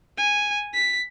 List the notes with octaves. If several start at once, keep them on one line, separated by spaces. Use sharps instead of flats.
G#5
B6